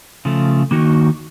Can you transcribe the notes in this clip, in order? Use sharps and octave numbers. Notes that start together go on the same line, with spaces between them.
C#3 F3 A3
D#3 A#3 D#4 F#4